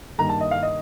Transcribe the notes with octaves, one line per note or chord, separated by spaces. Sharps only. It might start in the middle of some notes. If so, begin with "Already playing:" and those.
G2 D#3 A#3 A#5
A5
D#5
F5
D#5